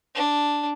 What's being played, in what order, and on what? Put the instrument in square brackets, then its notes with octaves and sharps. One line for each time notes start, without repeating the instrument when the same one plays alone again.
[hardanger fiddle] D4